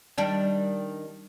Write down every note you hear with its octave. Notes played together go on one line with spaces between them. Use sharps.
D#3 G3 D4